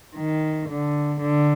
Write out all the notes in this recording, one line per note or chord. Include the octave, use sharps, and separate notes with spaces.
D#3
D3
D3